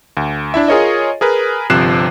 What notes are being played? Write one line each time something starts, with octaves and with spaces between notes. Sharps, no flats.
D2
D4 E4 E5
F4 G#4 A#4 C#5 D#5
G#4 A#4 B4
G1 C3 F3 F#6 C7 E7